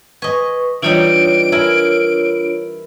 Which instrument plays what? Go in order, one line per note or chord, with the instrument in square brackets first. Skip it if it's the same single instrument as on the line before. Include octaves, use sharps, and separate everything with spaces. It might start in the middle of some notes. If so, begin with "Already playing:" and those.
[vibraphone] B4 C#6 [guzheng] D#5 G#5
[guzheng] E3 G3 D#4 [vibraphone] D4 F4 C#5 [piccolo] D7
[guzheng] E4 A#4 G#5